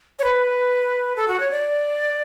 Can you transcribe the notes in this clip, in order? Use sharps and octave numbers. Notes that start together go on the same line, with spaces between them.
C#5
B4
A4
F#4
C#5
D5